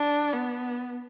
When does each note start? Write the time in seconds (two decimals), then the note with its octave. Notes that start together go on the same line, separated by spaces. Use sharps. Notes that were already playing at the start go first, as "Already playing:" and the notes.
Already playing: D4
0.33 B3